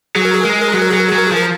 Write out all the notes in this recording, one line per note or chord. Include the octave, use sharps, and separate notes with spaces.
F#3 G#4
A#4
G#4
G#3 A#4
G#4
A#4
F#3 G#4
A#4
F#3 G#4
A#4
F#3 G#4
A#4
G#4
F3 A#4